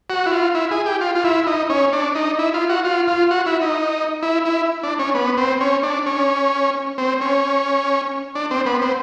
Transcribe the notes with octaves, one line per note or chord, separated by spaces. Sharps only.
F#4
E4
F4
E4
G#4
G4
F4
F4
E4
D#4
C#4
D4
D#4
E4
F4
F#4
F4
F4
F#4
E4
D#4
E4
E4
D4
C#4
B3
C4
C#4
D4
C#4
C4
C#4
D4
C4
B3
C4